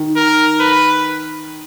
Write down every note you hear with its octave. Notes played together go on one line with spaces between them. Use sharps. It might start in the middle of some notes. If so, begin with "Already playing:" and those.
Already playing: D#3
A#4
B4